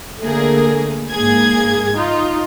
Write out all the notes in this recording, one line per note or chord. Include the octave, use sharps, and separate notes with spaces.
D3 A3 A#3 G#4 A#4
G#2 A#3 G#4 G#6
D#4 F4